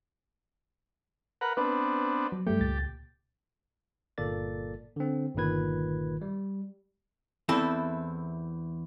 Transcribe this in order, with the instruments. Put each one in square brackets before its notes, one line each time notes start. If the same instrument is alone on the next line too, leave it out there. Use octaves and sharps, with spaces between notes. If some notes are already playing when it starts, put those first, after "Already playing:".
[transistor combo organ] A#4 B4 F#5
[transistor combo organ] B3 C4 D4 [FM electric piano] B4
[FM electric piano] F#3
[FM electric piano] G2 G3 A3 [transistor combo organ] G4
[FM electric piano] C#2 A#2 A6
[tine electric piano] G1 A#2 A#3 A4 D5 A6
D3 C4
G1 A#2 D#3 B4 G#6
G3
[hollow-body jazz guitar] E2 C4 E4 A4